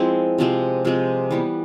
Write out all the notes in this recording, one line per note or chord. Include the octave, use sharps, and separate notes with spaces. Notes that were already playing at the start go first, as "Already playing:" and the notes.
Already playing: F3 G#3 C4 E4
C3 F3 G#3 C4
C3 F3 G#3 C4
E3 G3 B3